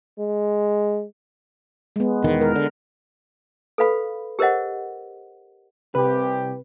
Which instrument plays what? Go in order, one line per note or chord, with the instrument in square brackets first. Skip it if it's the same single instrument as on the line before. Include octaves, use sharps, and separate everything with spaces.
[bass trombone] G#3
[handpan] G#3 B3
[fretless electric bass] E1 E2 D#3
[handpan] A#4
[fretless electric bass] D3
[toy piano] A4 B4 F5 B5
G4 A#4 C5 D#5 F#5
[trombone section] C2 G4 [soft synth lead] C3 [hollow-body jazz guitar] B4